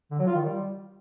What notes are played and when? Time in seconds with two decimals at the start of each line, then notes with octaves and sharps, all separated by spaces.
0.11 D3
0.19 F#3
0.27 F4
0.35 D#3
0.43 G3